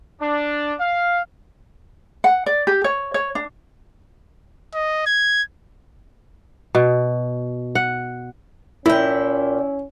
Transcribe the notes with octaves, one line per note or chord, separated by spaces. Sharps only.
D4
F5
F#5
D5
G4
C#5
C#5
D4
D#5
G#6
B2
F#5
A#2 C#4 E4 G5